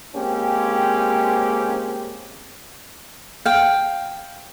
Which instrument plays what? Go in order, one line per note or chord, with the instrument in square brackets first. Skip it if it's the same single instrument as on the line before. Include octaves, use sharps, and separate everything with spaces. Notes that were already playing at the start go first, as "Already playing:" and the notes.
[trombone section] G#3 A#3 C4 C#4 G4
[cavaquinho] F5 G5